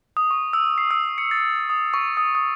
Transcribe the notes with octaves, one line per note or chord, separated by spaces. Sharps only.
D#6
C#6
E6
C7
E6
C#7
A6
D#6
C#6
D#6
D#6